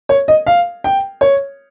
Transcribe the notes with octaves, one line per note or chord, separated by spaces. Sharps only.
C#5
D#5
F5
G5
C#5